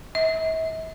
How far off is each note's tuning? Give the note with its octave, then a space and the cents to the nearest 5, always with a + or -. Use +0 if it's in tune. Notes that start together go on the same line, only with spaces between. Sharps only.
E5 -45